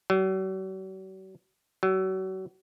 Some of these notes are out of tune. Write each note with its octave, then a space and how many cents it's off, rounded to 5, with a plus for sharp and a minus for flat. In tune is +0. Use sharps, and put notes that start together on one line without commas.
F#3 +45
F#3 +35